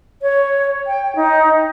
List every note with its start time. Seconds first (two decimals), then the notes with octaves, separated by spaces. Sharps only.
0.22 C#5
0.87 G5
1.16 D#4